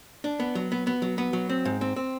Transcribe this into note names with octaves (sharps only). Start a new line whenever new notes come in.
D4
B3
F#3
B3
B3
F#3
B3
F#3
C4
G#2
C4
C4